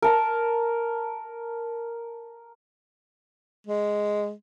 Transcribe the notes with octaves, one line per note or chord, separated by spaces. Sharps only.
A#4 A5 A#5
G#3